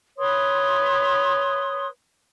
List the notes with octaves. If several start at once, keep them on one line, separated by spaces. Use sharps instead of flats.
B4 C#5 C6 D#6